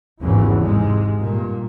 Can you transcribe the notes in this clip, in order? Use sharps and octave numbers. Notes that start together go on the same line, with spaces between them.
G#1 E2 G2 C#3 E3
G#2 C3 G#3
G2 A#2